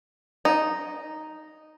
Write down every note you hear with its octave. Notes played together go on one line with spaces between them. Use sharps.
D#4